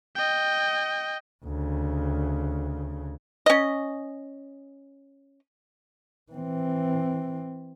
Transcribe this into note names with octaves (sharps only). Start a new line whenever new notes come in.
D#5 G5
D2 C#3
C#4 D#5
E3 C4